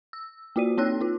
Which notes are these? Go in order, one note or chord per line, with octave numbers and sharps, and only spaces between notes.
E6
A#3 F4 F#4 D5 D#7
A#3 C4 D#4 C#5 E6 F#6
D#4 F4